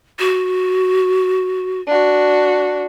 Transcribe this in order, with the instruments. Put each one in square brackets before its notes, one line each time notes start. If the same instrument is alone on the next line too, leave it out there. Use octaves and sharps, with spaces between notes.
[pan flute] F#4
[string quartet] D4 F#4